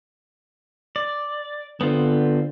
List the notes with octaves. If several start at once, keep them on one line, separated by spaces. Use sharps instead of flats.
D5
D3 B3 C4 F4